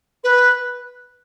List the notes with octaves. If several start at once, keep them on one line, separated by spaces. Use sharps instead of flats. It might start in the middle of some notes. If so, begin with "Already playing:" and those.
B4